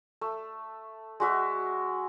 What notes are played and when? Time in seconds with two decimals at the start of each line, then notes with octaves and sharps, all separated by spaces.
0.21 A3
1.20 G#3 F#4 E5